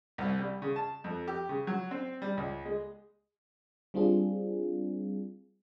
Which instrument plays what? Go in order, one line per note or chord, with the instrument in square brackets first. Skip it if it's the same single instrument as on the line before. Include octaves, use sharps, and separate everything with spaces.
[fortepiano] C2
G3
C#3
A5
F2
G4
C#3
F#3
C4
G3
C#2
G#3
[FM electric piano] G3 C4 D4 F4 G#4